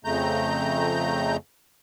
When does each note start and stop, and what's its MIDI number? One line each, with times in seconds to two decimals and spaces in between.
0.05 1.37 41
0.05 1.37 49
0.05 1.37 57
0.05 1.37 82
0.05 1.37 91